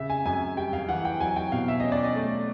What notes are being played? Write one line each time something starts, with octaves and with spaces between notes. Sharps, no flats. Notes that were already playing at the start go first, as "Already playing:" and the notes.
Already playing: C#3 E5
G#5
F#2 G#5
G3 G5
F5
E3 F#5
G5
F#3 G#5
G5
B2 F5
E5
C#4 D#5
D5
D#5
A3